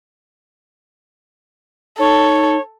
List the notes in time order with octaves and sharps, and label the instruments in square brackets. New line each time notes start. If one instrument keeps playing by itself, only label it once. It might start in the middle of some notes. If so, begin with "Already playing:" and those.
[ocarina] D#4 [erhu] A4 [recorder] C#5